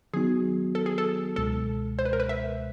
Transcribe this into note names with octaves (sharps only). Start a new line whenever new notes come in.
D#3 F#3 B3 D#4 F#4 G#4
A4
G#4
A4
C#2 B2 G#3 A4
C5
B4
A#4
B4
E5